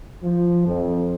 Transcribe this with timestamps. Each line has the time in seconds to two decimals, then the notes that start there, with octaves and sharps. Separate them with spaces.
0.23 F3
0.67 F2